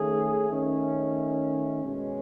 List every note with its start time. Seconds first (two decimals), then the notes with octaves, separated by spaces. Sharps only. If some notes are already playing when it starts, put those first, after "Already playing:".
Already playing: D#3 A3 C#4 G#4
0.49 D#3 A3 C#4
1.83 B2 G#3 C#4